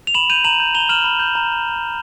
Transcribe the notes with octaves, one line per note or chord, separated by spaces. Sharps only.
F7
B5 E7 F#7
G6 D#7 F7
A#5 E7 F#7
G6
A#5 F7 G7
F6 E7 F#7
B5
G6
A#5